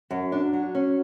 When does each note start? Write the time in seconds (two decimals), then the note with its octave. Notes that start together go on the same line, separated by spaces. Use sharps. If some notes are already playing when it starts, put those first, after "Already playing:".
0.11 F#2
0.32 D4
0.53 F#3
0.75 C#4